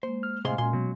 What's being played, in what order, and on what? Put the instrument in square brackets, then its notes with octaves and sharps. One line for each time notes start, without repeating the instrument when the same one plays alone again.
[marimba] G#3 A#3 [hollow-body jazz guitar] C5
[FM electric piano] F6
[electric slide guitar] A2 C5 [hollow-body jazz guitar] C3 G#4 C6 [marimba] D#5 F5 G#5
[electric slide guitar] A#2 [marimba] G#3 C#4 F#4 [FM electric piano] G#5 [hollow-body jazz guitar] C6
[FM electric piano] B2 [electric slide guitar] F#3